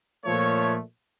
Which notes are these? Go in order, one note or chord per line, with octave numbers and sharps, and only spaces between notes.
A#2 F3 A3 C#5